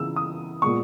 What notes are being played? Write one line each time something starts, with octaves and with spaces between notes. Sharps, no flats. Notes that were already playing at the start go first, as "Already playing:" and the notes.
Already playing: C#3 E3 B3 E6
D#6
A#2 G#3 B3 C#6